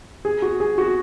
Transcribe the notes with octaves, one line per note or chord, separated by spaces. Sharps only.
G#4
F#4
G#4
F#4